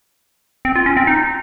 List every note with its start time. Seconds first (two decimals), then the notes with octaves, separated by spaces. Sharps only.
0.65 C4
0.76 F4
0.86 C#4
0.97 C4
1.07 D#4